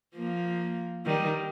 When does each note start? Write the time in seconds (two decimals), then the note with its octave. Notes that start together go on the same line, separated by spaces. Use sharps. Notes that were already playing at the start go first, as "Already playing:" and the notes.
0.15 F3 A#3
1.06 D#3 G3